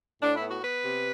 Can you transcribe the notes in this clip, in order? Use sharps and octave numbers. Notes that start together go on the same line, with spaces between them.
A2 D4
E4
B3
F#4
B3 B4
C3